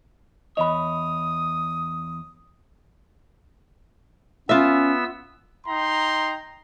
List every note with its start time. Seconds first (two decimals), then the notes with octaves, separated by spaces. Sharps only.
0.57 E2 C#5 D#5 B5 D#6
4.49 B3 C#4 F4 E5 E6
5.67 D#4 G5 A#5 C6